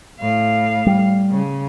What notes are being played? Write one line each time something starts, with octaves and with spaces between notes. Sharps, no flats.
A2 F5
G3
C#3